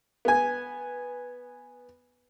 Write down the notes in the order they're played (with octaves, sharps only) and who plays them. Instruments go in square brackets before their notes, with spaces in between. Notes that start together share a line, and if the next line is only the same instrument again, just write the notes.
[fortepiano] B3 G#5